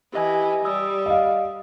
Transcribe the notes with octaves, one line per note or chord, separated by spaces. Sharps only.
E3 G4 D#5 G#5
G3 D#6 E6
D#5 F5